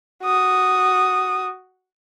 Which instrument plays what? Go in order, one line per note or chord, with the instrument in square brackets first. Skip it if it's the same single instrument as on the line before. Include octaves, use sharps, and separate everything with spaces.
[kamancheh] F#4 D#6